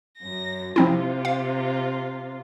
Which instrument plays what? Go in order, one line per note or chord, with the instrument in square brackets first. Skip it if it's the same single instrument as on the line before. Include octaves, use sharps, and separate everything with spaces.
[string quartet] F#2 A#6
[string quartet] C3 F4 [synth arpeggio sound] F3 C4 E4
[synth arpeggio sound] F5